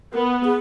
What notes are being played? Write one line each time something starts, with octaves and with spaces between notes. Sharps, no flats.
B3 A#4
G#4